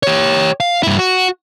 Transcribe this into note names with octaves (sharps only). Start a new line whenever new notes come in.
G4 C#5
F5
G2 E4
F#4